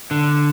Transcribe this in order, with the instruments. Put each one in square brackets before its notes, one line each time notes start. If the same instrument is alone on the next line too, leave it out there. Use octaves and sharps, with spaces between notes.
[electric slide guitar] D3